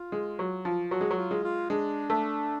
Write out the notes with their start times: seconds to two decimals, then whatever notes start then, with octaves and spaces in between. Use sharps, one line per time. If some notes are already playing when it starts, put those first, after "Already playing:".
Already playing: F4
0.12 G#3
0.39 F#3
0.65 F3
0.91 F#3 F#4
1.01 G#3
1.11 F#3
1.18 F4
1.31 G#3
1.44 F4
1.70 G#3 D4
2.10 A3